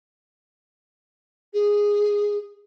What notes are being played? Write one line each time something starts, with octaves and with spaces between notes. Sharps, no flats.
G#4